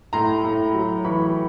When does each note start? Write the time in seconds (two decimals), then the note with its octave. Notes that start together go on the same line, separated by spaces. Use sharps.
0.13 A2 A#5 C6
0.44 A2
0.74 F#3
1.05 E3 B5 C#6